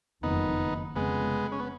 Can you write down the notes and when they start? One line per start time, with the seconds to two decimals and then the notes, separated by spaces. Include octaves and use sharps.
0.23 F#1 F2 D#3 B3 D#4
0.96 F1 F2 C#3 G#3 B3
1.52 C#4
1.60 B3